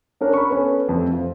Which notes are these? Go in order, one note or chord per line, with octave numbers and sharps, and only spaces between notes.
C#4 D4 A#4 C#5
B5 C#6
B3 C#4 A4
F1 F2 A3
F3